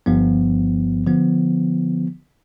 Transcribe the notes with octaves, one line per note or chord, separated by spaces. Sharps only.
G1 G2 F3 B3
D3 F3 B3